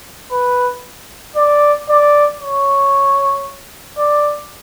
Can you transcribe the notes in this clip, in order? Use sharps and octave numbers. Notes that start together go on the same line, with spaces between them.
B4
D5
D5
C#5
D5